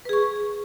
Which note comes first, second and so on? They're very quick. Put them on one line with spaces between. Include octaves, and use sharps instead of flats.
B4 G#4 C#6